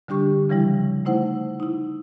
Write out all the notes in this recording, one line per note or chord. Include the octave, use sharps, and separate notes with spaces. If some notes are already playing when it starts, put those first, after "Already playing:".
D3 G3 D4 G4 C#6
C#3 E3 F3 G3 E4
A3 D#4 E4 C5 F#5
D#4 E4